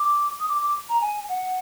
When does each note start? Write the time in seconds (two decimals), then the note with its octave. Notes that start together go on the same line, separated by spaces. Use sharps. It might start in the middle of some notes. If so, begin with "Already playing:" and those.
Already playing: D6
0.40 D#6
0.48 D6
0.62 D6
0.89 A#5
1.01 G#5
1.28 F#5